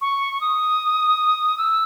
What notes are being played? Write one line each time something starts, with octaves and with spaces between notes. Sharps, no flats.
C#6
D#6
E6